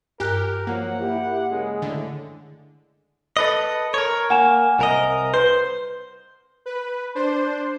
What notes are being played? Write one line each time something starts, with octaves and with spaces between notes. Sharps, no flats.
G2 G4 A#4 F#6
F3 F#3 A#3 F#5
E4 G4
C#3 G#3 G#4
A2 D3
A4 B4 D#5
A#4 C#5
A#3 F#5 G#5 E7
C2 A#4 D#5
B4 C5
B4
D4 C5